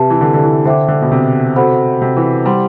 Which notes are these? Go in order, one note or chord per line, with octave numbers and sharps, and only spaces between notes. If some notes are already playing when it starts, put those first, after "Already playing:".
Already playing: C3 G4 B4 E5 A5
E3
D3
D3
E3
D3 C5 E5 G5 D6
D3
B2
C3
F#4 A4 C5 F#5 B5
C3
E3
G3 E4 G4 C5 F#5 C6